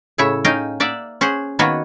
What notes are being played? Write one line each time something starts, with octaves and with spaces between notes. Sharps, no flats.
A2 C#3 E4 C#5 E5
C#4 D#4 D#5 F5 G5
A#3 D5 E5 F#5
C#4 G#4 C5 F#5
D#3 A#3 B3 F#4 B4 C#5